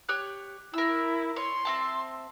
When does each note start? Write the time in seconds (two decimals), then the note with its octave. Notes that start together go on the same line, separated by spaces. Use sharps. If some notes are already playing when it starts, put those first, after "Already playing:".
0.09 G4 C#5 F#6
0.74 E4 A#4 E6
1.36 C#5 C6
1.65 C4 E5 A5